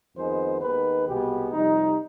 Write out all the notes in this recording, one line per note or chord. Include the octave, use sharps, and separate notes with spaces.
F2 D#3 G#3 B3 C5
D#2 D#3 G#3 B3 B4
C2 B2 G#3 B3 G4
F2 C3 G3 D#4